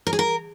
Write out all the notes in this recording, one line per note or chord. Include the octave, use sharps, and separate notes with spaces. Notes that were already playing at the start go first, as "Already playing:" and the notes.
A#4
G#4
A#4